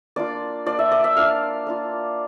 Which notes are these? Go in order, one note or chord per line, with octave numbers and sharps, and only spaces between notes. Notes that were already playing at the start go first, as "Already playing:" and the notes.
A#3 D4 F4 D5
A#3 D4 F4 D5
E5
D5
E5
A#3 D4 F4 F5
A#3 D4 F4